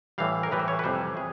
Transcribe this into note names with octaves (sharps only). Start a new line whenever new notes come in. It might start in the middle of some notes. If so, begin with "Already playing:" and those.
A2 E3 G3 F5
A#4
A2 E3 G3 B4
C5
C#5
B4
F2 C3 E3 G3 C5
G#4